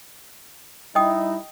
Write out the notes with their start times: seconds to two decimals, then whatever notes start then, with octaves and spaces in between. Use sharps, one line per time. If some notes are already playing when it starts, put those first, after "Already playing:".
0.95 G3 D#4 E4 D#5 G5 D#6